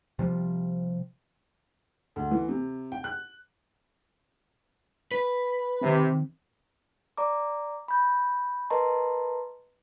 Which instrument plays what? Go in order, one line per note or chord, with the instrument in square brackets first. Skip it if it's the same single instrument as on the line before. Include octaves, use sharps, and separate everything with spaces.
[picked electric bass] C3 F3 G3
[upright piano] D2
E3
C3
G5
F#6
[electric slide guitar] B4
[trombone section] C3 [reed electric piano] D#3 C4
[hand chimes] D5 A#5 D6
B5 G6
A#4 B4 D#5 A5 A#5 C6